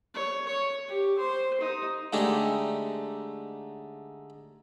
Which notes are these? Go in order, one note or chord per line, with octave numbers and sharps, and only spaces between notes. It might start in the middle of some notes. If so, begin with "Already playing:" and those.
C#5
C#5
G4
C5
D#4
D3 G#3 A3 D#4 G4